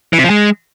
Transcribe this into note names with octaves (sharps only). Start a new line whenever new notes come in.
E3
C3
F3
G#3